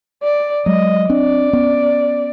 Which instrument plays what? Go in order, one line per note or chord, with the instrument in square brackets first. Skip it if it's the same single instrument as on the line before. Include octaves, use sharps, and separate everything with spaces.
[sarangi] D5
[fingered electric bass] F#3 G#3 [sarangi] D#5
[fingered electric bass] C4 D4 [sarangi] D5
[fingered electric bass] B3 C#4